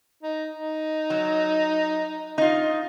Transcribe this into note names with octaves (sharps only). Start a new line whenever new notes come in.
D#4
D#4
F#3
D#4 F4